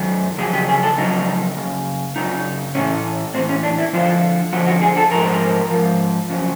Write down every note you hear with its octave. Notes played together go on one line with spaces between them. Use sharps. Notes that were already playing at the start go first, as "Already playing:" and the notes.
Already playing: F#2 D#3 F#3
F2 C#3 F#3 G#4
G4
G#4
A4
F2 C#3 F#3 D#4
F#2 C#3
F#2 C#3 D#4
A2 E3 C#4
A2 E3 C4
C#4
D4
E4
F2 D3 F3 F4
F2 D3 F3 F#4
F#4
G#4
A4
G#2 F3 A#4
G#2 F3
F2 C#3 F#3